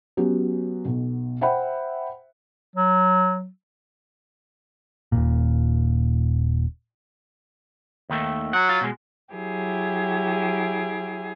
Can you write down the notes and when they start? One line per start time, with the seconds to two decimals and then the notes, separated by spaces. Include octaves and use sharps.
0.17 F#3 B3 C#4 G4
0.85 B1 B2
1.41 C5 E5 F#5 G5 B5
2.76 F#3
5.12 D#1 G#1 A#2
8.10 D#2 D#3 A3
8.53 F#3 F#5
8.69 F4
8.81 B2 G#3
9.33 F#3 E4 G4 G#4